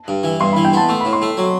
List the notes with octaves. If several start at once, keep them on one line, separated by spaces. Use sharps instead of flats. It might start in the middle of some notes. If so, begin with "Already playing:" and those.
Already playing: A5
G2
E3
G2 C6
E3 B5
G5
B3 A5
A3 C6
A2 B5
C6
A3
F#3